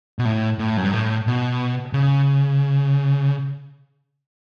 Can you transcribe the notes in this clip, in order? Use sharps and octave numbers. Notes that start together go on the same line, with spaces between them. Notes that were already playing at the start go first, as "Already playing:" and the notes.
B2
A2
A2
F#2
G2
A2
B2
C#3